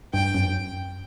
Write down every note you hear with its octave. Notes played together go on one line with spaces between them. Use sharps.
G2 G5
F#2